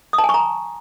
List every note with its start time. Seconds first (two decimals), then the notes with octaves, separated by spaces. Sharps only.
0.13 D#6
0.18 A5
0.24 G#5
0.29 C#6
0.34 A#5